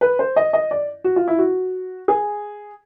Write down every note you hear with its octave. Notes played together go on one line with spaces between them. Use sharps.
B4
C5
D#5
D#5
D5
F#4
F4
E4
F#4
G#4